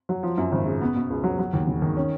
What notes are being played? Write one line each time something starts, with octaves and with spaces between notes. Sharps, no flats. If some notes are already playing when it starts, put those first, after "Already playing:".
F#3
F3
F#2
G#1
C#3
B3
B2
C#2
F#3
F#3
D#2
E1
D#3
C#4